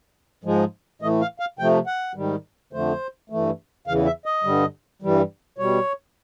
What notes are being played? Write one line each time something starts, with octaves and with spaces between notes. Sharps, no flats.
G#2 F3 G#3
A2 E3 A3 D#5
F5
F5
C3 F3 A3 G5
F#5
G#2 D#3 G3
F2 D3 F3 A3 C5
G2 E3 A3
E2 C#3 E3 F5
E5
D#5
G2 D3 G3
G2 E3 G3
B2 G3 C#5